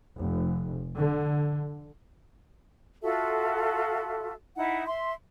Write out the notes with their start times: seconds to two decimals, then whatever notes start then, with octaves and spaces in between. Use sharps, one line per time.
0.16 F1
0.98 D3
3.03 F4 F#4 A4 E5
4.56 D#4 E4 F#5
4.86 E5 C6